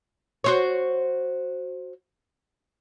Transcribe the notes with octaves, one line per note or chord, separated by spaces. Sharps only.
F#4 C5 C#5